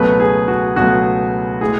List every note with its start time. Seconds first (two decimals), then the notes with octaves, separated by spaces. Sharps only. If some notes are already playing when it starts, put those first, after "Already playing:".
Already playing: C#2 B2 F#3 A3 B4
0.20 G#4
0.48 F#4
0.76 C#2 B2 F#3 A3 F#4
1.61 A2 G#3 G#4